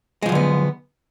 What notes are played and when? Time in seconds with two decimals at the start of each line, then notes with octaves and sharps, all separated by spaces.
0.22 G#3
0.26 F3
0.29 F#3
0.32 D3
0.35 B3